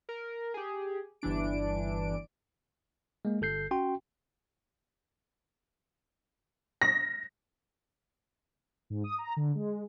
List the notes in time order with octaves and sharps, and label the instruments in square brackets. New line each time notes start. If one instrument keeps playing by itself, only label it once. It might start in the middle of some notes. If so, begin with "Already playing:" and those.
[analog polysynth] A#4
G4 G#4
G1 E3 D4 D7
[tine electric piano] G#3 A#3
G1 A4 G6 C7
C#4 F#4 G5 C6
[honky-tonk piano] A#6
[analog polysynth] G#2
D#6
A#5
D3
G#3